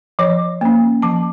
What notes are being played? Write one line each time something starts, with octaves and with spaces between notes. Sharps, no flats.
F3 C#5
A#3 C#4
F3 A5